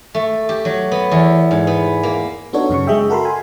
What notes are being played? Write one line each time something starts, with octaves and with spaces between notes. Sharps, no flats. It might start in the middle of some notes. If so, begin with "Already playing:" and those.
A3
G4
F#3
B3
E2
G#2
B3
A#3
B3 D4 D#4 F#4 A4 C#5
F#2 C#3 C#6
G#3 G#4 D#5 E5 G5
F#4 A4 A#4 B5 C6
G#5